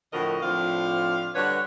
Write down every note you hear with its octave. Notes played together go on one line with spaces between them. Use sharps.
A2 D3 F3 F#4 A#4 D#5
A2 F3 C4 D4 F4 F5
D3 G3 D4 F#4 B4 C#5